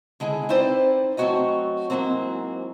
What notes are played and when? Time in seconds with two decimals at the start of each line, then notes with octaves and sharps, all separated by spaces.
0.20 D3 G#3 E4 G#4
0.49 C4 D#4 E4 B4 C5 D5
1.17 F#3 A3 C4 F#4 C#5 D#5
1.90 G#2 E3 F#3 A#3 C4